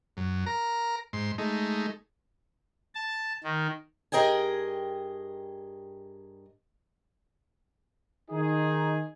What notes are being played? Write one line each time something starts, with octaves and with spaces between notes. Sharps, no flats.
F#2
A#4 A#5
G#2 C6
G#3 A3 D#4
A5
D#3
G2 G#4 A#4 D#5 G5 G#5
D#3 D#4 G#4